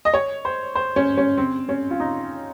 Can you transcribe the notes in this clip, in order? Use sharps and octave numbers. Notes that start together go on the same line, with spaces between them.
D#5
C#5
C5
C5
C#4
C#4
C4
C#4
F4
D#4